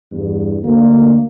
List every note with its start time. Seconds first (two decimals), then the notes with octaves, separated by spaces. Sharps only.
0.12 E2 G2
0.64 D2 A#3